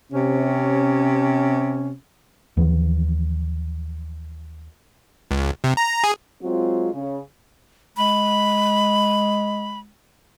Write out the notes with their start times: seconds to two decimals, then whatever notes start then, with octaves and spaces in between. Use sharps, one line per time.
0.12 C3 C#4
2.57 D#2 E3 F3
5.31 C#2
5.64 C3
5.77 A#5
6.04 G#4
6.42 F#3 G#3 C4 F4
6.93 C#3
7.97 G#3 B5